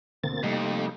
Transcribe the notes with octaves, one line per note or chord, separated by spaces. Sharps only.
D2 B2 D3 A#3 C4 A6
F2 C3 G3 A3 A#3 D#4 G4